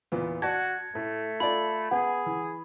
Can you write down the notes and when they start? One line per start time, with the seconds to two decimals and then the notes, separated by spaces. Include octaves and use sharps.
0.12 E2 A#2 B3
0.42 F#4 D5 A5 G#6
0.95 A2 A3
1.40 F4 A4 D5 B5
1.91 B3 G#4 F#5
2.26 E3